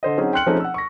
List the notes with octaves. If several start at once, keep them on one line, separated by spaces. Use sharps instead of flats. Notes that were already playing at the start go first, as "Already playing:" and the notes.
D3 C5 D#5
F#3 C4 C#4 D#4 G#4
G5 C6 F6 F#6 C#7 F#7
F3 A3 C4 C#4 D#4 G#4
F#5 E6
C#6 A#6